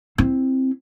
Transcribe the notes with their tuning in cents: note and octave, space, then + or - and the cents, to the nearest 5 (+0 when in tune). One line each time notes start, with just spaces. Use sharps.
C4 +5 E4 +10